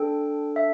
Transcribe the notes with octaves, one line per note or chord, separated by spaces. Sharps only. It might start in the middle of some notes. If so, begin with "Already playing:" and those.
Already playing: D4 A4 G5
E5